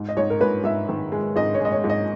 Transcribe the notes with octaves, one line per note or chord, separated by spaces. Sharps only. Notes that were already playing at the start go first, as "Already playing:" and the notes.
Already playing: G#2
D#5
G#2 C#5
A#4
G#2 B4
G#2 E5
D#3
G#3
G#2 D#5
C#5
G#3
D#5
C#5
G#2
D#5